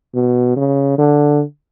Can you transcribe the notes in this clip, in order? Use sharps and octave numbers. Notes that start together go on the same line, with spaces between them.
B2
C#3
D3